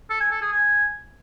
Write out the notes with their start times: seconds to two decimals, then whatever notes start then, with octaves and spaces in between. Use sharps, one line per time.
0.10 A4
0.20 G#5
0.31 A4
0.41 G#4
0.52 G#5